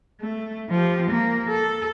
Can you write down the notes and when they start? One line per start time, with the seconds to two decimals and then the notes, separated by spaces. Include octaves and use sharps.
0.21 A3
0.69 F3 G4
1.11 A#3
1.48 A4